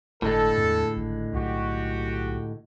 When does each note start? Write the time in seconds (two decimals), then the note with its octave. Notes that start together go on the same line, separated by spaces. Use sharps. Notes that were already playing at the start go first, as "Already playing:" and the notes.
0.22 G1 A2 D3 G#3 A4
0.58 E2
0.97 G#1
1.34 B1 F#4 G4